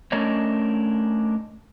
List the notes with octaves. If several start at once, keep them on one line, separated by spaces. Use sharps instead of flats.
A3 C#4 D4 A#4 C#5 D#5